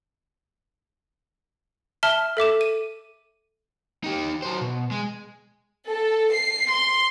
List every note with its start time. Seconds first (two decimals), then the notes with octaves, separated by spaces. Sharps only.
2.03 E5 A5 F6 G7
2.37 A4 E5 D6 E7
2.61 D#7
4.04 D#4 G4
4.42 F#3 C5
4.61 B2
4.91 G#3
5.88 A4
6.33 C7
6.70 C6